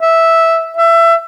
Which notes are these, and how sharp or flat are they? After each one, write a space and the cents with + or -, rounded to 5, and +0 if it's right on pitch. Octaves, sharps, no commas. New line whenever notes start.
E5 -5
E5 +20